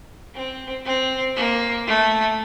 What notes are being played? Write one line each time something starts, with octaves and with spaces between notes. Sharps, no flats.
C4
C4
A#3
A3